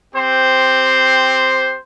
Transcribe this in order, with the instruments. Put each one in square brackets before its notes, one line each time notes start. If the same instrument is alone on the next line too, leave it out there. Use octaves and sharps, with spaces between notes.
[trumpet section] C4 G4 C5